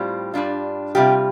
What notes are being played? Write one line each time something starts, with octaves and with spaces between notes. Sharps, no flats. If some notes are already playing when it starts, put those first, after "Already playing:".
Already playing: A2 G3 C4 F4
G2 G3 D4 F4
C3 G3 F4 G4